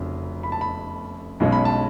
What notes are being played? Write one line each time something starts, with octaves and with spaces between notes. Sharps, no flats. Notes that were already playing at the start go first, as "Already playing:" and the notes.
Already playing: F1 F2 C#3 F#3
B5
A5
B5
B1 B2 G#3 C#4
B5
A5